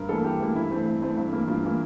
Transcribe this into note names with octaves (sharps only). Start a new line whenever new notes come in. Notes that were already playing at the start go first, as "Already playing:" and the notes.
Already playing: G2 A#4
E3 A#3 A4
G2 G4
E3 A#3
G2 E4
E3 A3 C4
G2
E3 A3 C4
G2
E3 A#3
G2 F4
E3 A#3